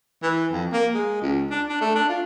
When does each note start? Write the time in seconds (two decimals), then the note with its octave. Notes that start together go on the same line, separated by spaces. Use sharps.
0.23 E3
0.52 F2
0.73 A#3
0.94 G#3
1.22 C#2
1.51 D4
1.69 D4
1.81 A3
1.96 D4
2.09 F4